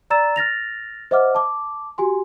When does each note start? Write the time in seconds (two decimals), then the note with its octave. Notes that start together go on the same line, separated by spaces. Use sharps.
0.10 D5 A#5 E6 A6 E7
0.36 F6 A6 A#6 F7
1.11 C5 D#5 E5 F#5 D6 F6
1.35 A5 D6
1.98 F#4 G4 G#5 C6